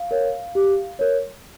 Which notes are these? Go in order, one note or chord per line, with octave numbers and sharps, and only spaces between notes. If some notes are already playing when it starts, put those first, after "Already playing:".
Already playing: F5
A#4 C#5
G4
A#4 C#5